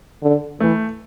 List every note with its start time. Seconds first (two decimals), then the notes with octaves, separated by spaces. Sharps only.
0.22 D3
0.60 E3 A3